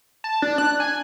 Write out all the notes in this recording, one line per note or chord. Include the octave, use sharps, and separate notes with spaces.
A5
D4
F#6
G#5